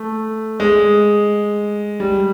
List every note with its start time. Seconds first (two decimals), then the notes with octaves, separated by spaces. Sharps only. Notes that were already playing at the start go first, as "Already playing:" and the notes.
Already playing: A3
0.60 G#3
2.00 G3